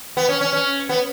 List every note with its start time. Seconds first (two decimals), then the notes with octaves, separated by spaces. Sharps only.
0.17 B3
0.29 C#4
0.41 C#4
0.53 C#4
0.89 B3